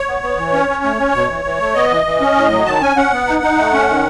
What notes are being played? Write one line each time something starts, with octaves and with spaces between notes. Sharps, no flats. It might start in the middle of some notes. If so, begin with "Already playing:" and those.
Already playing: C#5
B3
B3
E3
C#4
C#4
A3
C#4
B2
E3
E3
A3
B3 D#5
E3
E3
C#4
A2
F#3
D#3 A5
C#4 G#5
C#4 F#5
B3
D#4
D#4
A3
C#4
D#3